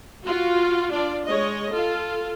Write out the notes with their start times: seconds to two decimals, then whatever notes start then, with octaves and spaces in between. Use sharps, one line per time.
0.24 F4 F#4
0.91 D4 F4 D5
1.26 G#3 C#5 D#5
1.69 F4 A4